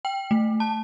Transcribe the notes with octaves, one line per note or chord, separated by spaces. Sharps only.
G5
A3
A5